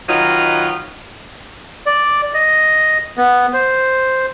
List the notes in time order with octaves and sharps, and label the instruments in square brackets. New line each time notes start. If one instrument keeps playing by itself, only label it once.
[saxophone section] D#3 F#3 D#4 F4 B4
[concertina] D5
D#5
B3
C5